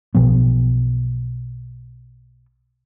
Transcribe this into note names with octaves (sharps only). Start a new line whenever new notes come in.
B1 B2 F3 B3